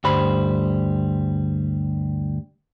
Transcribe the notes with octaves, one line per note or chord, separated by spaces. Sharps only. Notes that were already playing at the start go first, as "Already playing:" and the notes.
D2 G2 G3 C5 B5